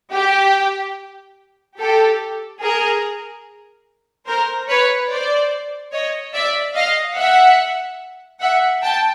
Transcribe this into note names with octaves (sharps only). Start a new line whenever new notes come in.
G4
G4 A4
G#4 A#4
A#4 C5
B4 C#5
C5 D5
C#5 D#5
D5 E5
D#5 F5
E5 F#5
E5 F#5
G5 A5